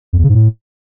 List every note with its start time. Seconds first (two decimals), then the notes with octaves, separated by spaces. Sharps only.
0.13 F2
0.18 E2
0.24 C#3
0.29 G#2
0.35 A2